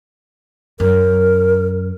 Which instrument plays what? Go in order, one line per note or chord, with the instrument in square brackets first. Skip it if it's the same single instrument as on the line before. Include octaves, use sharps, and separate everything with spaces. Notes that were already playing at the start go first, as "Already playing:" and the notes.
[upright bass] F#2 [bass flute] A#4